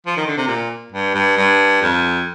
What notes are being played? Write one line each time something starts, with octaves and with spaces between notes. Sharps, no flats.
F3
D#3
D3
C3
A#2
G2
G2
G2
F2